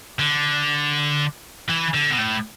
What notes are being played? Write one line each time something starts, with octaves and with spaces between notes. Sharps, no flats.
D3
E3
D3
B2
A2